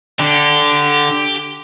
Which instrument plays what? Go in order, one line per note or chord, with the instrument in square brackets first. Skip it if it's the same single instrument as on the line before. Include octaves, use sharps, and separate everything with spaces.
[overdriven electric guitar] D3 [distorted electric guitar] G4